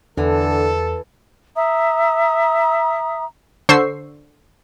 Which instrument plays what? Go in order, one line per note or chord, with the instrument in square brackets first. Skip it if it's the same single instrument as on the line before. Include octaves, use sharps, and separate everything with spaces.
[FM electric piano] E2 [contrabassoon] D3 [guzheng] E3 [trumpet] A4
[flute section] E5 A#5 D#6
[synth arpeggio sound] D3 C5 C#6 E6 C7